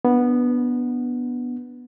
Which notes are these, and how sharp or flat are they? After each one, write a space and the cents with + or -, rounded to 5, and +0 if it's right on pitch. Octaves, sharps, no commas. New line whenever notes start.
B3 -10 D4 +0